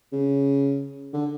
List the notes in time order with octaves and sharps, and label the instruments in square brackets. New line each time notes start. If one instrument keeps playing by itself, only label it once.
[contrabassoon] C#3
D3